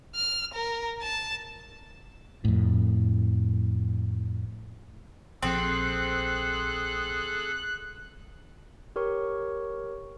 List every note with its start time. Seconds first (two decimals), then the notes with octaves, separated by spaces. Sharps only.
0.15 F6
0.54 A#4
1.02 A5
2.45 F2 A2
5.42 A#1 F3 C4 G#4 A4 F#6
8.96 G4 A#4 C#5 C#6